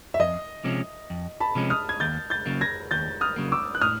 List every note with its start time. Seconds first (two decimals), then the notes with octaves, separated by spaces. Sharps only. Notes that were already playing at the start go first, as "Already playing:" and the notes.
0.14 E5
0.20 F2 D#5
0.64 C3 F3 G#3 C#4
1.10 F2
1.40 A5 B5
1.55 C3 F3 G#3 C#4
1.70 D#6 F6
1.89 G#6
2.00 D#2 G6 A6
2.30 G6 A6
2.46 C#3 F#3 A#3
2.61 G#6 A#6
2.91 D#2 G6 A6
3.21 D#6 F6
3.36 C#3 F#3 A#3
3.52 D6 E6
3.75 F#6
3.81 A2 D#6 F6